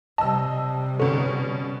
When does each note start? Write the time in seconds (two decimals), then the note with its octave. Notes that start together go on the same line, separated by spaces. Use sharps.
0.18 C3 G3 D#5 A5 E6
1.00 B2 D3 C#4